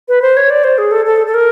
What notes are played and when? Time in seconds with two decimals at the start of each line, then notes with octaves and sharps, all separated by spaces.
0.08 B4
0.22 C5
0.37 C#5
0.50 D5
0.64 C5
0.78 G#4
0.91 A4
1.06 A4
1.27 A4
1.34 A#4